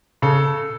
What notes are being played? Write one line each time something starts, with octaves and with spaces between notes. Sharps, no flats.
C#3 A4